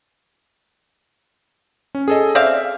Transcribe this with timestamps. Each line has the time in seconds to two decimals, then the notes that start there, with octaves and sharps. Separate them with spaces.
1.95 C#4
2.08 G#4 A4 D#5
2.35 C4 D5 E5 F5